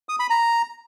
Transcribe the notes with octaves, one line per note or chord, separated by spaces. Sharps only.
D#6
B5
A#5